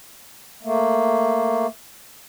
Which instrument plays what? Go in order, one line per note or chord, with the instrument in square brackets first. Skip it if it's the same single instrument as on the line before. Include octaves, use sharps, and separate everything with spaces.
[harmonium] A3 A#3